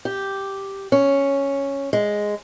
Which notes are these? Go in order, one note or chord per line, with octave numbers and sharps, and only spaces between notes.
G4
C#4
G#3